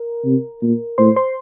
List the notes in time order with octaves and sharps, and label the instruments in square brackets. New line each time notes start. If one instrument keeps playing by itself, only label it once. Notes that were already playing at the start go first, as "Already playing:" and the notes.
Already playing: [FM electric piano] A#4
[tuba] C3
A#2
[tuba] A2 [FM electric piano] C5 C6
[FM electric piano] C5 C6